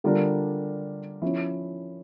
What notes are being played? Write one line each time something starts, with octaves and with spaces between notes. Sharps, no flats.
D3 G3 D4 F4 A#4
F3 C#4 E4